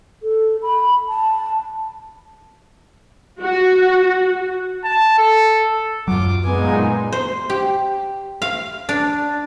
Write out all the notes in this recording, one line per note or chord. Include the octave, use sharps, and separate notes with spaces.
A4
B5
A5
F#4
A5
A4
F#2 F#3 F4 D6
A#2 G#3 B3 D#4 G#5
C5
G4
F5
D4